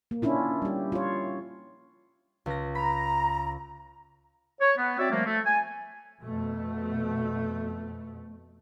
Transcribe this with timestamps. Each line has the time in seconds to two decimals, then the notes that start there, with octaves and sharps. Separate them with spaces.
0.11 A#3
0.22 C#4 D4 E4 F4
0.62 G3 G4
0.92 F4 C#5
2.46 C#2 A#6
2.75 A#5 B5
4.61 C#5
4.77 B3
4.99 C4 F#4 C#5 D5 E5
5.11 F3 G3 A3 A#3
5.25 A3
5.45 G#5
6.20 F2 B2 A3